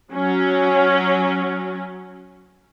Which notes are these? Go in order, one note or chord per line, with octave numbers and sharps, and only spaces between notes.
F#3 C#4